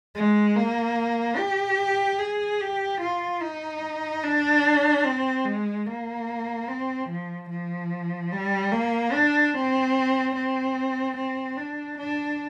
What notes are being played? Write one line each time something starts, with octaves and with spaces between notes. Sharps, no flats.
G#3
A#3
G4
G#4
G4
F4
D#4
D4
C4
G#3
A#3
C4
F3
F3
G3
A#3
D4
C4
C4
C4
D4
D4